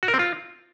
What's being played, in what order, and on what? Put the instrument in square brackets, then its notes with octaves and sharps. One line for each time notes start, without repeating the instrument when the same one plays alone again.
[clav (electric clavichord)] F#4
A#4
C4
F4